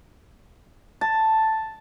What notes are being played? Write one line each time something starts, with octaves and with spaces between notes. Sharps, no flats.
A5